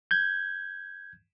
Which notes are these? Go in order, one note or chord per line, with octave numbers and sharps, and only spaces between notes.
G6 G#6